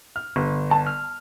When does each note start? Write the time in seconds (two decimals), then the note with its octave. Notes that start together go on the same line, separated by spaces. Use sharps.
0.16 F6
0.36 G1
0.71 A5
0.87 F6